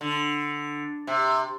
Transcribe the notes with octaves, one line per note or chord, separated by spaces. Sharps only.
D3
C3